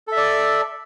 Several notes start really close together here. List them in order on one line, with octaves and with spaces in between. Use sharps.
A4 E5 D5